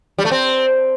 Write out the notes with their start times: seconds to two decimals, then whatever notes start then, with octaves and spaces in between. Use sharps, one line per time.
0.18 G3
0.25 A3
0.31 C4